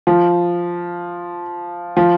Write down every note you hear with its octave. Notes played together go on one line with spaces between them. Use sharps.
F3
F3